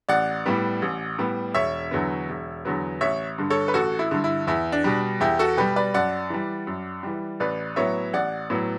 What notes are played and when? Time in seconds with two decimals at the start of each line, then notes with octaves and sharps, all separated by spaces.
0.09 A1 D5 F#5
0.46 A2 G3 B3
0.82 A1
1.18 A2 G3 B3
1.55 E1 C#5 E5
1.91 E2 D3 F#3 B3
2.29 E1
2.65 E2 D3 F#3 B3
3.01 A1 C#5 E5
3.38 G2 D3
3.50 A4 C#5
3.68 B4
3.74 A1 F#4 A4
3.99 E4
4.11 G2 D3
4.24 E4
4.47 E2 E4
4.72 D4
4.84 B2 G3
5.20 E2 E4 G4
5.39 F#4 A4
5.57 B2 G3 G4 B4
5.76 B4 D5
5.94 F#2 D5 F#5
6.30 E3 G3
6.67 F#2
7.03 E3 G3
7.40 A1 B4 D5
7.76 A2 F#3 B3 C#5 E5
8.13 A1 D5 F#5
8.50 A2 F#3 B3